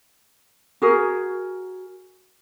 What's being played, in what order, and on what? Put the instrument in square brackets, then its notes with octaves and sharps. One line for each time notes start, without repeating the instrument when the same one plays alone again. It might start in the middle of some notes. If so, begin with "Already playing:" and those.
[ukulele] F#4 G#4 A#4